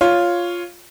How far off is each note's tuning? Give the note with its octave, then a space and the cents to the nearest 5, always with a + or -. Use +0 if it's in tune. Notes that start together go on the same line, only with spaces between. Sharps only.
F4 +0 C#5 +5